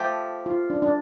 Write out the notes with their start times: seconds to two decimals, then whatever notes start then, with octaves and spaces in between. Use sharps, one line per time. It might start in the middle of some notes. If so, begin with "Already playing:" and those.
Already playing: F3 A3 G4
0.46 F4
0.70 D4
0.82 D4